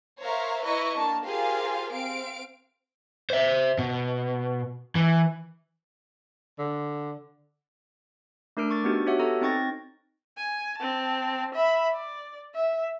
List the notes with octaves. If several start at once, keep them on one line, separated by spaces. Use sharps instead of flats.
A#4 C5 C#5 E5 F5 A#5
E4 B4 D#5 A#5 C#6
A#3 D4 A5
F4 G4 G#4 A#4 C5 F5
C4 F5 D7
C5 E5
B2
E3
D3
A3 D4 A#4 F6 D7
C#6 D6 A6
B3 D4 D#4 F#4 G4
F#4 G4 C#5 E5 F#5
B3 A4 A#5
C4 D#4 G5 C#6 A6 A#6
G#5
C4 A5
E5 B5
D5
E5